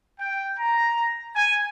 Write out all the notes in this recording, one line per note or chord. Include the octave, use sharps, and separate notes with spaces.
G5
A#5
G#5